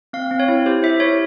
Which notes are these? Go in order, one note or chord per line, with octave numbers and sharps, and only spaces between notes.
C4 F5
C4
C#5
E4
G4 C5
E4 E5
E4 C#5